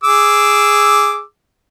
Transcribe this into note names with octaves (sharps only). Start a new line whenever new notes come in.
G#4 D6 E6